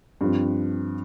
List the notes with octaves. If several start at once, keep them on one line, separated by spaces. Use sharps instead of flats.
G2 F3 C4